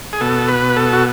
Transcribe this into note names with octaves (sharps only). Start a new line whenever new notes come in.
G#4
B2 A4
B4
A4
F#4